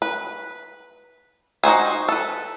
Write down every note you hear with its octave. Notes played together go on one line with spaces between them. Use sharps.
B4
D#4 F#4 C5 G#5
A4 B4